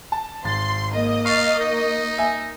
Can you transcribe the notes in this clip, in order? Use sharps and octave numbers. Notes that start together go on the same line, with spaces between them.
A5
G#1 C6 A6
A#3 D#5
F5 C#6 A6
D#4
E5 G#5